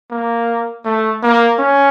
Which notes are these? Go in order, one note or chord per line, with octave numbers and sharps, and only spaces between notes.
A#3
A3
A#3
C#4